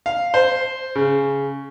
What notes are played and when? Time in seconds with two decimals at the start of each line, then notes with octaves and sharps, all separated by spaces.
0.06 F5
0.34 C5
0.95 C#3